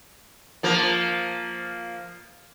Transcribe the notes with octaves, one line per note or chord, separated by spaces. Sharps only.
F3 A#3